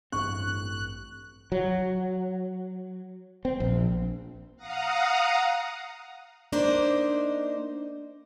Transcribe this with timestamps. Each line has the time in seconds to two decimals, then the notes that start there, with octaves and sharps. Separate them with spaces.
0.12 A1 G2 C4 C#6 F#6
1.52 F#3
3.45 C4
3.60 A#1
4.56 F5 F#5 A#5 D#6
6.52 A#3 D4 D#4 C5